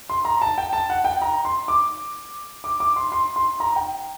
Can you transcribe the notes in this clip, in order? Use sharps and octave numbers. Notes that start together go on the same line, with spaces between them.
C6
A#5
A5
G5
A5
F#5
G5
A#5
C6
D6
D6
D6
C6
C6
C6
A#5
G5